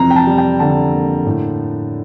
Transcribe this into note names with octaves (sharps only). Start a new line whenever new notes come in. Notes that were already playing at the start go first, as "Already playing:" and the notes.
Already playing: F2 C3 E3 A#5
G5
A5
G3
G5
D3 A5
A#3
A2